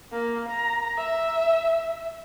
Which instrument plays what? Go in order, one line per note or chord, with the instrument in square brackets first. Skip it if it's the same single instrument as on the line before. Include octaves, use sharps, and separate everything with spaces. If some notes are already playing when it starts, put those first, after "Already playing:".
[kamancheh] A#3
A#5
E5